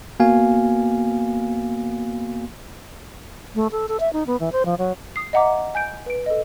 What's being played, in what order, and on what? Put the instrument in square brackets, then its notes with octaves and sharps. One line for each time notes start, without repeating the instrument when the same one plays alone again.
[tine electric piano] A#3 B3 F#4 F5 G#5
[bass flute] A3
A4
A4
E5
D#4
B3
E3
C5
F3
F#3
[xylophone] D#6 C7
D#5 E5 F#5 A#5 D6
G#5 G6 D7
B4 D7
A4 D#5